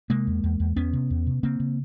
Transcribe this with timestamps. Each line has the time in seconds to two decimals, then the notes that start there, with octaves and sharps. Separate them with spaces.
0.10 C3 G#3 A#3
0.27 E2
0.44 E2
0.60 E2
0.76 E2 B3 C#4
0.93 C3
1.10 E2
1.27 C3
1.43 C#3 A#3 C4
1.60 C#3